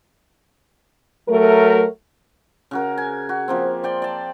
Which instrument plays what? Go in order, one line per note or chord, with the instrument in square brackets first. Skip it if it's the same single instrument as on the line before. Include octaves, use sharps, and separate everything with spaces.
[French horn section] F#3 A3 A#4
[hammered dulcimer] C#3 F#4 A#4
G#5
F#4
F3 A#3 C4
D5 G5 C6
D5 A5